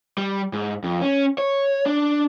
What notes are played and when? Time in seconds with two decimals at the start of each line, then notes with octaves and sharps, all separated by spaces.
0.18 G3
0.53 G#2
0.84 F2
1.02 C#4
1.38 C#5
1.86 D4